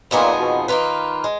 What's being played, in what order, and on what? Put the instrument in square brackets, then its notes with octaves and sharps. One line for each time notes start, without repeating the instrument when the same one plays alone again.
[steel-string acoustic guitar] F2 F3 B3 D#4 G#4 [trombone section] A#2
[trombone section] B2
[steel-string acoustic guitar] D#3 A#3 F4 B4
G#3